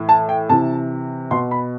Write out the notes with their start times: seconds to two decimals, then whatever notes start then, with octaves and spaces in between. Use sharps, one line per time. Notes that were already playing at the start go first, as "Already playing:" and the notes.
Already playing: A2 E3
0.09 A5
0.29 G5
0.49 C3 E3 A5
1.31 B2 C6
1.51 B5